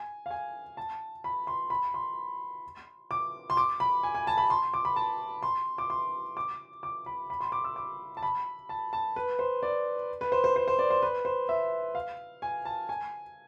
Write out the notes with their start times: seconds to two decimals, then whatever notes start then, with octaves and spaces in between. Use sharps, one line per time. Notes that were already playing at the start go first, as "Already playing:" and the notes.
Already playing: G#5
0.26 F5
0.31 G#5
0.77 A5
1.24 B5
1.47 C6
1.70 B5
1.94 C6
3.11 D6
3.50 C6
3.57 D6
3.80 B5
4.03 G#5
4.15 G#5
4.27 A5
4.38 B5
4.50 C6
4.74 D6
4.85 B5
4.96 A5
5.43 C6
5.78 D6
5.90 C6
6.37 D6
6.83 D6
7.06 B5
7.30 B5
7.40 C6
7.52 D6
7.64 E6
7.76 D6
8.17 A5
8.23 B5
8.69 A5
8.93 A5
9.16 B4
9.39 C5
9.63 D5
10.21 B4
10.32 C5
10.44 C5
10.56 C5
10.68 C5
10.79 D5
10.90 C5
11.02 B4
11.25 C5
11.49 E5
11.95 F5
12.42 G#5
12.65 A5
12.89 G#5